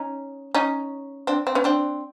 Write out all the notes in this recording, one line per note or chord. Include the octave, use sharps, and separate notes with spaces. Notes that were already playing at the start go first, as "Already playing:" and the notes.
Already playing: C#4 D#4
C#4 D#4
C4 D4
C4
B3 C#4
C4 D4